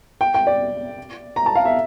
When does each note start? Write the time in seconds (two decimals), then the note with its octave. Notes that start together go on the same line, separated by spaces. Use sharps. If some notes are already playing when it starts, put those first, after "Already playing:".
0.21 G5
0.34 G5
0.47 D5
1.36 A#5
1.46 A5
1.55 F5
1.65 E5